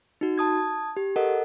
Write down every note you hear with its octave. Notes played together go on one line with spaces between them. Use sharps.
D#4 F#4
A5 D#6 G#6
G4
A4 A#4 D#5 F#5